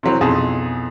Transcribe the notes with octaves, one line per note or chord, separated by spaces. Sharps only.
C3 E3 F#3 C4
B1 F2 E3 D#4 G#4 A5